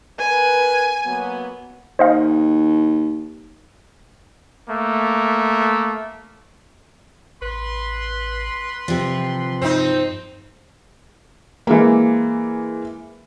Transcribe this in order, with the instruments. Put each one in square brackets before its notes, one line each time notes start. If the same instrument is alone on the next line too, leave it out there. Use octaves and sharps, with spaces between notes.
[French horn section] A#4 B4 [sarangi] G#5
[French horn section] F#3 A#3 B3
[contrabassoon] D#2 [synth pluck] C5 D#5 F5
[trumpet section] A3 A#3
[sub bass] A1 [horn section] B4 C6
[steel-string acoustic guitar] C3 F3 [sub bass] E3
[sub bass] G2 [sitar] C4 D#4
[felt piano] E3 G#3 A#3